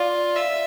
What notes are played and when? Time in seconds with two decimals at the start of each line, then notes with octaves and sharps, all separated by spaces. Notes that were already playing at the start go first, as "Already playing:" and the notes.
Already playing: F4 D5
0.36 E5